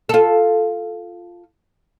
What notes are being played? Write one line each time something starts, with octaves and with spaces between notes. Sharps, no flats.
F4 A4